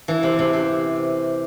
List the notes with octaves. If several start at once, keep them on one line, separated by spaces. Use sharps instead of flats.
E3
C3
C3
C3